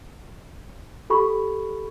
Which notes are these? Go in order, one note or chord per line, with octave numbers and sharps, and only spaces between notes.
G4 A4 B5 C#6